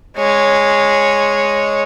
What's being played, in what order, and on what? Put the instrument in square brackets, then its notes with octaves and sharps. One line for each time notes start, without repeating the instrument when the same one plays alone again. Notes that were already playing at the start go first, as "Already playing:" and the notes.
[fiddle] G#3 C#5